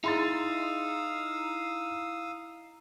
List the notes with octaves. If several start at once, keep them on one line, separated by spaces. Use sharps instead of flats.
D#4 E4 G#4 F5 C6 D#6 E6 A6